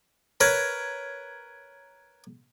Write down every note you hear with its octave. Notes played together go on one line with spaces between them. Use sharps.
A#4 B4 C#5